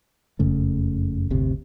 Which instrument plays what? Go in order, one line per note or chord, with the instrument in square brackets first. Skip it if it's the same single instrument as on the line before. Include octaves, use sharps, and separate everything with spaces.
[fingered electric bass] F#1 F2 C#3 A3
D1 G1 D2 C3